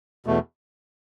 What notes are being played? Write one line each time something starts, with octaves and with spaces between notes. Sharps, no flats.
E2 B2 A3